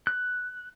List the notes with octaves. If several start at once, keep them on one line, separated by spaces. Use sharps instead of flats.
F#6